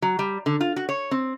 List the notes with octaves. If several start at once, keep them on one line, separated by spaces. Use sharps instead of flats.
F#3
G3
D3
F4
F#4
C#5
C4